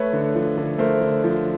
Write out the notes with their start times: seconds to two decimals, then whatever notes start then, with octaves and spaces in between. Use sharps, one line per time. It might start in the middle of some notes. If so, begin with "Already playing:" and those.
Already playing: A3 B4 C#5
0.13 D3
0.35 F3
0.57 D3
0.78 A3 A#4 C5
1.01 D3
1.24 F3